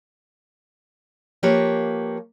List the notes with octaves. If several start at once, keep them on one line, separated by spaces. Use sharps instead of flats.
F3 A#3 G4 A#4 B4 C#5